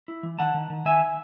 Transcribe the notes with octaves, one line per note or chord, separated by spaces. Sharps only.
E4
E3
D#3 F#5 A5
D#3
D#3
D#3 E5 G#5